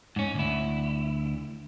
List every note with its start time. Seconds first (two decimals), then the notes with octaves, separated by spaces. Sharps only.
0.16 G#2 C#4
0.35 D2 E4